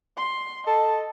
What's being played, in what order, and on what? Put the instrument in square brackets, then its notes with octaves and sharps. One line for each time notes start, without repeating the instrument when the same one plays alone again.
[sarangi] C6
[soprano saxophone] A4 [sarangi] D#5 [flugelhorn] A5